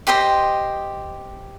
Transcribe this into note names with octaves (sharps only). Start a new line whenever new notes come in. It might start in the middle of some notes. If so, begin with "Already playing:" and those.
G4 C5 D#5 C6